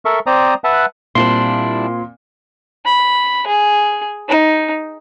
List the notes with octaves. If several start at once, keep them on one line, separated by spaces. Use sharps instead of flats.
A4 A#4 E5 C#6
C4 C5 D5 A#5 D#6
B4 E5 F#5 A5
A#2 G3 C4 D4 E4 C6
B5
G#4
D#4